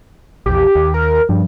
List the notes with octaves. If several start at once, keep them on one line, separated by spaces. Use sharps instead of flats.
A#1 E2 G4
D#2
A#4
G2 F3